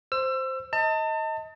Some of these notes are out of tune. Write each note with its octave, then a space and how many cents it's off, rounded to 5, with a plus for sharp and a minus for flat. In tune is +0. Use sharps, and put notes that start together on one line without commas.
C5 +0 E6 +30
D#5 +25 A5 +35